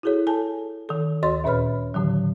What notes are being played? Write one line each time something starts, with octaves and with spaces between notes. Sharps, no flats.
E4 F#4 G#4 A4 C#5
A4 G#5 A5
D#3 A4
D2 F#4 C#5 C6 A6
D#2 A#2 B4 C#5 B5 F6
A2 D3 D#3 F#3